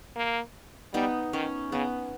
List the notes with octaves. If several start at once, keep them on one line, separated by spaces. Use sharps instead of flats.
A#3
G3 B3 D#4
D#3 C#4
C#3 B3